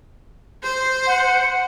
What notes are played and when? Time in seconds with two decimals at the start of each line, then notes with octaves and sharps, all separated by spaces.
0.63 C5
1.07 F#5